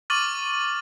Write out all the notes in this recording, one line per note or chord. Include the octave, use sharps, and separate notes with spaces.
C#6 D6 F6 A6 D#7 F#7